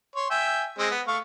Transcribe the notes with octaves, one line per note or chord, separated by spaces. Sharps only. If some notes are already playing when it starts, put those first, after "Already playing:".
C#5 C6
E5 G5 G#5
G#3 C4
B3
A3 F5 C#6